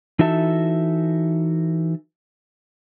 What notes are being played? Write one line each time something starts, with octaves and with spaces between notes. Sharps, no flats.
E3 D#4 F#4 A4 E5 A5